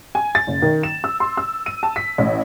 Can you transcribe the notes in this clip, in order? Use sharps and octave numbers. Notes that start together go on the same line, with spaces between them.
G#5
A6
F#1
D#3
E7
E6
C6
E6
D#7
A5
B6
A1